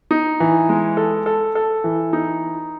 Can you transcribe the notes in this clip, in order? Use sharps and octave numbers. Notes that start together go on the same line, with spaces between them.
D#4
E3
G#3
A4
A4
A4
E3
D#4